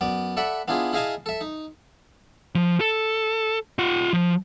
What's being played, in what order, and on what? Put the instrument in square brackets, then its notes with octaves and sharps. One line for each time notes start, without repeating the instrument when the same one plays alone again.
[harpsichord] F#2 B3 D5
A4 D5 E5 F#5 B5
B3 D4 E4 F4 G#4
E4 G#4 D#5 F5 G#5 A5
A4 E5
D#4
[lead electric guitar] F3
A4
F4 F#5
F3